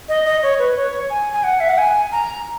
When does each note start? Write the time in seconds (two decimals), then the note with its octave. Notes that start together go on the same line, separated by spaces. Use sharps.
0.09 D#5
0.25 D#5
0.43 C#5
0.59 B4
0.76 C#5
1.10 G#5
1.33 G#5
1.44 F#5
1.60 E5
1.69 F#5
1.78 G#5
2.12 A#5